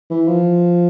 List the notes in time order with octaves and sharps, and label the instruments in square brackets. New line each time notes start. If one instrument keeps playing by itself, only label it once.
[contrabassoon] E3
F3